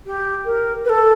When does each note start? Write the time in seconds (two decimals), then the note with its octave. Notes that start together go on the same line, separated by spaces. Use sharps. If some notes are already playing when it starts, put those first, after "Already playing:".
0.06 G4
0.45 A#4
0.84 B4
0.89 A4